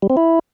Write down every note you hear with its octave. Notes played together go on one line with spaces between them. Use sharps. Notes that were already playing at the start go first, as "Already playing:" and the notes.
G3
C4
E4